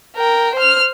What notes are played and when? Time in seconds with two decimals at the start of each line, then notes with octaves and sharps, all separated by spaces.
0.17 A#4 G5
0.55 C5 F6